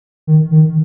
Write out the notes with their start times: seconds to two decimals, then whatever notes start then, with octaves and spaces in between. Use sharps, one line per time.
0.27 D#3
0.51 D#3